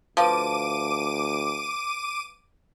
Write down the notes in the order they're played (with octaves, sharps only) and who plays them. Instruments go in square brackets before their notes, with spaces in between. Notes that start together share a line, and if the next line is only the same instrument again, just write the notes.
[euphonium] D2 [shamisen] F3 [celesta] B4 F5 A5 [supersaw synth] D6 D#7